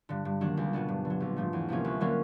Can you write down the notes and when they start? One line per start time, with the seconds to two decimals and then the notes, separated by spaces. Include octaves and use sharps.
0.09 G2 D3
0.25 G2
0.41 D#3 F#3 A#3 D4
0.57 C#2
0.73 B2 F#3 B3 D4
0.88 G2
1.05 D3
1.10 F#3
1.20 A#1
1.36 G#2 F3 A3
1.53 E2
1.69 C3 F3 A#3 C#4
1.85 D2
2.01 D3 F#3 A#3 C#4